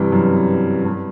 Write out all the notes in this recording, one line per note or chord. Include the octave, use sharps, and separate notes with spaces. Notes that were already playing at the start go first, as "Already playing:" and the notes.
Already playing: G2 C3 E3
F#2
G2